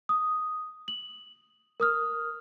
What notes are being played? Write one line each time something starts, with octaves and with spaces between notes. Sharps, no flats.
D#6
F#7
A#4 D#6 F6